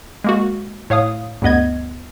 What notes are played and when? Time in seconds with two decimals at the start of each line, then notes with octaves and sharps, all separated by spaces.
0.24 G#3 A#3 F#4
0.90 A2 C#5 F5 D#6
1.42 D2 G2 B3 D#5 G#6